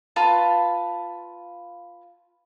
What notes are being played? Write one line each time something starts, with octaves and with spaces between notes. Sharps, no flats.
F4 B4 F5 A5